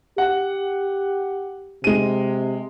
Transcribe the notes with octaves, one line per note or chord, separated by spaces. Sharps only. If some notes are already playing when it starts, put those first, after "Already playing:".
G4 F#5
C3 G#3 D#7